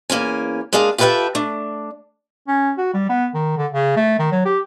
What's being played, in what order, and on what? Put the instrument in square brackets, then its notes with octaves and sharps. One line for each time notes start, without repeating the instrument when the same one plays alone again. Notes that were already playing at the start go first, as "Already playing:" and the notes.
[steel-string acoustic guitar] E2 A#3 C#4 G#5
G#3 A#3 D4 G#4 F5
F4 G4 A4 B4 E5 G5
A3 D4
[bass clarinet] C#4
F#4
G3
B3
D#3
D3
C#3
A3
D#3
F#3
G4